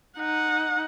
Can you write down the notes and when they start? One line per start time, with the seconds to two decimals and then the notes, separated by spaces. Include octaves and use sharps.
0.19 D#4 F#5